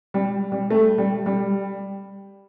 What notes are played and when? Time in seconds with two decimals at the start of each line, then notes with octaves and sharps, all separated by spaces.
0.14 G3
0.52 G3
0.70 A3
0.98 G3
1.26 G3